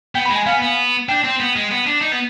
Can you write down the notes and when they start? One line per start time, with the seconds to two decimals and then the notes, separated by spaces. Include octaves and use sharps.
0.15 B3 G5
0.25 B5
0.30 G#3
0.35 G#5
0.46 B3 F5
0.62 B3
1.09 D4 G5
1.24 C4
1.40 B3
1.56 G#3
1.71 B3
1.86 D4
2.01 D#4
2.12 B3